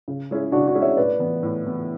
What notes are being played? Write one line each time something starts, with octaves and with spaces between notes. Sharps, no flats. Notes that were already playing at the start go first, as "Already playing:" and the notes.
C#3
G#3 C#4 E4 G#4
C#3 D4 F#4
D4 F#4
G#3 C#4 E4 G#4
C#5 E5
A2 B4 D5
E3 B3
A2
E3 B3